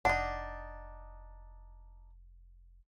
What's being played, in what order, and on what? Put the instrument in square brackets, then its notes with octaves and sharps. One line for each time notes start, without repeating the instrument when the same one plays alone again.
[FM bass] F1 [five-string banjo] D4 D#4 [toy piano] F#5